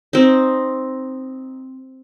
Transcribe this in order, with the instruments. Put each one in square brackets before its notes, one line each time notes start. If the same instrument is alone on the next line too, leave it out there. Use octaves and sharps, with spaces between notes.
[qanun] C4 D#4